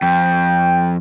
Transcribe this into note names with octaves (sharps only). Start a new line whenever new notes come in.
F2 G5